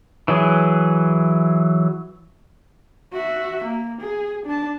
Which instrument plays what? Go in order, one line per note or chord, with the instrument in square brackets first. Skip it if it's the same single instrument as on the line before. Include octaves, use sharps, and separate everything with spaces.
[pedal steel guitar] E3 F#3 G#4
[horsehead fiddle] F#4 E5
A#3
G#4
D4 A5